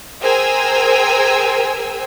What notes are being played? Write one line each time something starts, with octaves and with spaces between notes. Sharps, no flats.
G#4 A#4 C5 G5 G#5 E6